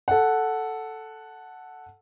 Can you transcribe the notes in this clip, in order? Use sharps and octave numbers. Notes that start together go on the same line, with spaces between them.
A4 F#5